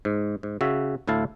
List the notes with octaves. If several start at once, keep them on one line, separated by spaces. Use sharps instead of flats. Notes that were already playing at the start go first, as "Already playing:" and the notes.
G#2
G#2
C#3 F#4 E5
D2 A2 E4 F5 A5